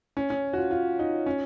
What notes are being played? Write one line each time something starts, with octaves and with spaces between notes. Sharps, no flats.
C#4
C#4
F#4
F4
F4
D#4
C#4